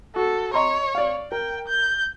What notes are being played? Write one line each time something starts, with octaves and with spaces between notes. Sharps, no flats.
F#4 A4
C#5 D#5 A#5 C6
D5 F5
A#4 G5
G6